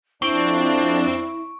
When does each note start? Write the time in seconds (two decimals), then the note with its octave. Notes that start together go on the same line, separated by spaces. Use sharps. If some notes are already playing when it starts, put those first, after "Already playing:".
0.22 F2 C4 D4 E4 C#6 D7